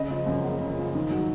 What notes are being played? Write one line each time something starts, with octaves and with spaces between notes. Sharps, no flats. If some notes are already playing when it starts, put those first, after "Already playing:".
Already playing: C#3 D#5
F3
F#2
F#1
C#3
F3
D#3
F#3